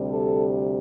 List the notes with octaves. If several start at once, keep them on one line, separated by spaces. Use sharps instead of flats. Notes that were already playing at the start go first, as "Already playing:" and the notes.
Already playing: D2 C3 G3
A4